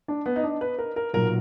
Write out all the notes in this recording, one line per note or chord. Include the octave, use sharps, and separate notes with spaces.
D4
B3
D#4
D4
B4
A#4
A#4
B1 A#2 F#3 A#4